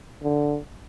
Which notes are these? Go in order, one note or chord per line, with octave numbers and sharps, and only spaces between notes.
D3